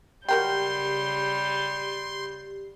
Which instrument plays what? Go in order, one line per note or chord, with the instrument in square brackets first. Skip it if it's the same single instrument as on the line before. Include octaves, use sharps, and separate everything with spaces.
[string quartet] C#3 G3 G6 [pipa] F#3 A#4 G5 [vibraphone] G4 [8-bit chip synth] C6